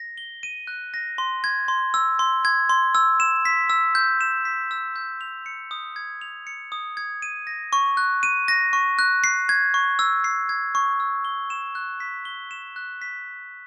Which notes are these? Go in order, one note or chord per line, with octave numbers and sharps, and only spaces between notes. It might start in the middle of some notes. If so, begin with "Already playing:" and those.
Already playing: A#6
G7
D#7
F#6
A#6
C6
G#6
C6
E6
C6
G#6
C6
E6
E7
B6
E6
G6
E7
B6
E6
G6
F7
C#7
D#6
G#6
F7
C#7
D#6
G#6
D#7
A#6
C#6
F#6
D#7
A#6
C#6
F#6
C7
G#6
C#6
E6
C7
G#6
C#6
E6
G7
E7
F#6
B6
G7
E7
F#6
B6